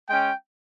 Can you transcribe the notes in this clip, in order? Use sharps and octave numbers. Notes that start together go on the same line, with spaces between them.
G#3 C#4 G5